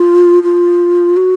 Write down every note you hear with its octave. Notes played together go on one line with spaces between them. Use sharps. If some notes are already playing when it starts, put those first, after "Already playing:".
Already playing: F4
F4
F#4